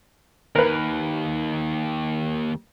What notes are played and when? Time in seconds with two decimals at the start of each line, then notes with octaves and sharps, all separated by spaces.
0.56 D#2 A#4 B4